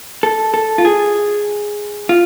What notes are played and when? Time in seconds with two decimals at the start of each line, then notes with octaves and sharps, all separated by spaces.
0.23 A4
0.54 A4
0.78 F4
0.85 G#4
2.09 F4